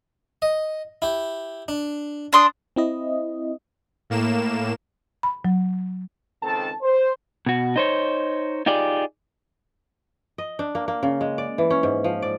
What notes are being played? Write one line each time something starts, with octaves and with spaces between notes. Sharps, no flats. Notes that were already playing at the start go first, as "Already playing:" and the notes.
D#5
E4 G4
D4
D4 C6 D#6
C4 E4 D#5
A2 A#3 E7
B5
F#3
C#2 D#3 C4 A4 A5
C5
B2 F#4
D#4 C5 C#5
D#4 F4 G4 G#4 D5
D#5
D4
A#3
A#3
C#3
G#3
D5
E3
C#4
G#2
F3
D5